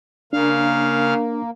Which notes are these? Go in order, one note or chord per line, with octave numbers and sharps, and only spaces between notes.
C#3 A#3 D4 F5